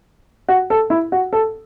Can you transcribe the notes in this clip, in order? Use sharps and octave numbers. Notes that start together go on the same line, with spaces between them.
F#4
A4
E4
F#4
A4